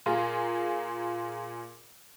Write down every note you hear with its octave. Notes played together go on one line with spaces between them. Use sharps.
A#2 F4 G#4 A#4